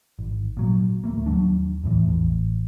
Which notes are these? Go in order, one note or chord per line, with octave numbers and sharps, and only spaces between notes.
G#1
A#2 F#3
D1 A3 A#3
D#2 F#3 D4
E2 A2 E3
A1